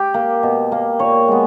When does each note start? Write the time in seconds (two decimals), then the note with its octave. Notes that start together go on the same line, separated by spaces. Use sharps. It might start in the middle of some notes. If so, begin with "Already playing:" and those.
Already playing: G4
0.14 A#3
0.43 B2
0.72 A#3
0.99 A#2 C#5
1.28 G#3 B3